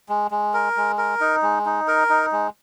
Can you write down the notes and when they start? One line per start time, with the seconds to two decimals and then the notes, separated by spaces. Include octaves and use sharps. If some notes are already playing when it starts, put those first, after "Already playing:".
0.09 G#3
0.31 G#3
0.54 A#4
0.77 G#3
0.98 A#4
1.21 D#4
1.42 G#3
1.66 D#4
1.88 A#4
2.09 D#4
2.32 G#3